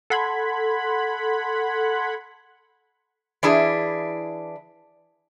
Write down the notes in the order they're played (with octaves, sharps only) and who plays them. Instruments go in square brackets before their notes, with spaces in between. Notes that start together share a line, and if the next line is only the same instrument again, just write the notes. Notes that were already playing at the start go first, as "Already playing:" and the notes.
[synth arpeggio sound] A4 F#5 B5 C6 G#6
[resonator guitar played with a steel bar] E3 D4 E4 G#4